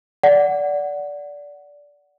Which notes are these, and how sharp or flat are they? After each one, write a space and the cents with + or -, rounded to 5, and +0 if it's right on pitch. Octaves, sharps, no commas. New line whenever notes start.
D5 -15 F#5 +0